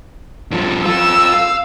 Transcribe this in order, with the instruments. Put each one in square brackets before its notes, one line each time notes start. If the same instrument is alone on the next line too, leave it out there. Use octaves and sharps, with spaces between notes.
[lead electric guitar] G2 F3
[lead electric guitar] F4 A4 [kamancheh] E6
[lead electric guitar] F5